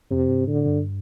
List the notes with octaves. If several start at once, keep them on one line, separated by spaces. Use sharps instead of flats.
F2 C3
G2
A2 D3
G2